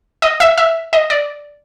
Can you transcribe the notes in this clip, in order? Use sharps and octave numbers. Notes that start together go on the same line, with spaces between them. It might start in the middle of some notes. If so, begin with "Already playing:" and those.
D#5
E5
E5
D#5
D5